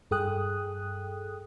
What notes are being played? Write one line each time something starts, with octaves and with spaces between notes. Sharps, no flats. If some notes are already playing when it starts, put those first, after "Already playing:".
G2 G#4 A4 G5 D#6 F#6